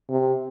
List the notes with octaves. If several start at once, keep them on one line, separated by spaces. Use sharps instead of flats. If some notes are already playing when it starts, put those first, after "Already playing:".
C3